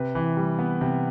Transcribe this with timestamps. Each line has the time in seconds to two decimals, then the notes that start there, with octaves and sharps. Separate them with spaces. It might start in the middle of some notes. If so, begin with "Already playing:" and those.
Already playing: C3 B4
0.15 E3
0.37 G3
0.59 B3
0.81 C3